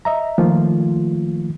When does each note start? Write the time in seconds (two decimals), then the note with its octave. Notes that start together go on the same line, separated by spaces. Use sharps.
0.05 D#5 E5 A#5
0.38 D#3 F3 A3 A#3 F4